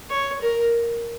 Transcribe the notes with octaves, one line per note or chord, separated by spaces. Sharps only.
C#5
A#4